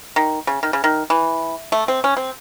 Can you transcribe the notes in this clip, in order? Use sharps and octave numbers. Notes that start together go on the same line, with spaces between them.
D#3
C#3
D#3
C#3
D#3
E3
A3
C4
C#4
C4